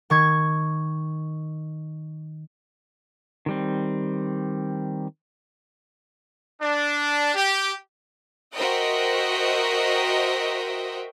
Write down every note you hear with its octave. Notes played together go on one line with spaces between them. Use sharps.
D#3 C#6 G#6
D#3 G3 C4
D4
G4
F#4 A#4 C5 D#5 E5 G5